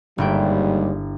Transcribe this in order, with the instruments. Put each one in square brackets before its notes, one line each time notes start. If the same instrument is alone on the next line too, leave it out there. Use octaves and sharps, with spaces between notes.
[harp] G1 E4 G5 [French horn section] D#2 G#2 G3